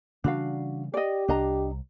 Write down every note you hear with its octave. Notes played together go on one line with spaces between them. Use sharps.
C#3 E3 G3 D4 F#4 F5
G4 D5 D#5
C2 D4 D#5 A#5